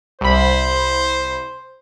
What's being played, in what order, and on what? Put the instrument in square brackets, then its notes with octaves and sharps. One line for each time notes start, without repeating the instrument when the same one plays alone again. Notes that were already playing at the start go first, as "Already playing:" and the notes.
[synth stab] C2 B5 [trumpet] C5